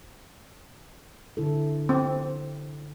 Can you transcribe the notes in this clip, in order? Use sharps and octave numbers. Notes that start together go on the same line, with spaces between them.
D3 E4 A4
C4